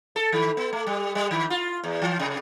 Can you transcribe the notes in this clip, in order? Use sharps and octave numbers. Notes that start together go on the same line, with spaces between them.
A4
D#3
B3
A3
G3
G3
D#3
F4
E2
E3
C3